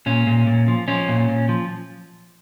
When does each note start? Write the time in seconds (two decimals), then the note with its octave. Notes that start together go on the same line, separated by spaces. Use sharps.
0.06 A#2 C#4
0.27 A#2
0.47 A#2
0.68 F3
0.88 F3 C#4
1.09 A#2
1.29 A#2
1.49 F3